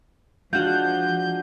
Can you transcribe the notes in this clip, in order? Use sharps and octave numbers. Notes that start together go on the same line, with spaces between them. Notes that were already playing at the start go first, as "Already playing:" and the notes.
F3 G#3 D4 F4 F#4 F#5 F#6 G6